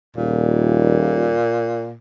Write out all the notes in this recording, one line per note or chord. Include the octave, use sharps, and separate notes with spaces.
D#1 A#2